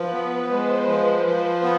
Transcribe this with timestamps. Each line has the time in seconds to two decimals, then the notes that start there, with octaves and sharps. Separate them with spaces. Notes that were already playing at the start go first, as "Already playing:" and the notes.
Already playing: F3 B4
0.13 B3
0.50 G#3 C5
0.87 F3 C5
1.25 F3
1.63 B3